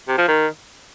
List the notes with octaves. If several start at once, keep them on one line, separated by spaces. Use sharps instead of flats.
C3
F3
D#3